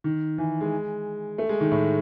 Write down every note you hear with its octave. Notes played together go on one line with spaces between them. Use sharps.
D#3
E3
G#3
A3
G#3
D#3
A2